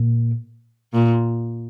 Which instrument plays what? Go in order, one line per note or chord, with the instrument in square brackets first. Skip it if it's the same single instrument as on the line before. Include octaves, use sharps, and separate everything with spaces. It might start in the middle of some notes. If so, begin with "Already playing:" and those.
Already playing: [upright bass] A#2
[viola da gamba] A#2